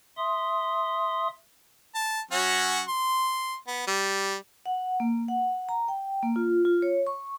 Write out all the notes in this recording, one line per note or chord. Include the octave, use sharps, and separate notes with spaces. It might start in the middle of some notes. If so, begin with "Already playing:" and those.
E5 C6 D#6
A5
F#3 C#4 F#4
C6
B3
G3
F#5
A#3
F#5
A#5
G5
A#3
F4
F4
C#5
C#6